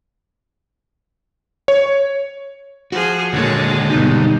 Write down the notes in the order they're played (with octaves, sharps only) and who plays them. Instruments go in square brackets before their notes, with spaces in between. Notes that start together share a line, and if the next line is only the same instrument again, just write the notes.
[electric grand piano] C#5
[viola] F3 G#4 [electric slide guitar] F#4
[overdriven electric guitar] D#2 D3 [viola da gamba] A#2 C#5 [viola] G#3
[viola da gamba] G2 B2 [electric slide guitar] D#4